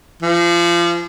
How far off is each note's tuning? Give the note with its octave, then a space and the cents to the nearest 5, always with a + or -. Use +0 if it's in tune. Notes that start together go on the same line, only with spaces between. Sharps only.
F3 -30